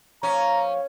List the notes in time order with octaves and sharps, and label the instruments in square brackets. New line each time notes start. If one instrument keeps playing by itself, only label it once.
[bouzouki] F3 A#3 [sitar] C#4 [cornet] A#5